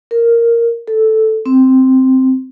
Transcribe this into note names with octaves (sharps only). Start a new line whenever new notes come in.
A#4
A4
C4